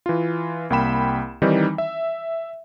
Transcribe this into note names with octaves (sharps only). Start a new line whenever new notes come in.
E3 F4
C2 A#3 G5 B5 E7
D#3 E3 G3 C4 D#4
E5